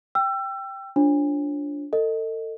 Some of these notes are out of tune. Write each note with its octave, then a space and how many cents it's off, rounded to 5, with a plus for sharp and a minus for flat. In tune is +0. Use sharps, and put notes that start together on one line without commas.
G5 +0 E6 +30
D4 -15 F4 +0 C#5 -45
A4 +35 D#5 +0